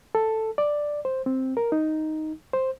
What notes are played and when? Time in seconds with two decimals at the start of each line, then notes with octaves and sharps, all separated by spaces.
0.15 A4
0.58 D5
1.05 C5
1.26 C4
1.57 A#4
1.72 D#4
2.53 C5